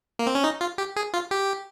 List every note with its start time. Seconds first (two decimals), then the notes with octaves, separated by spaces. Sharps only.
0.19 A#3
0.27 C4
0.35 C#4
0.44 D#4
0.61 F4
0.78 G4
0.96 G#4
1.14 F4
1.31 G4